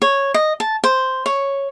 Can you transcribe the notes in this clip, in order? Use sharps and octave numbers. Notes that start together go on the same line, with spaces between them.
C#5
D#5
A5
C5
C#5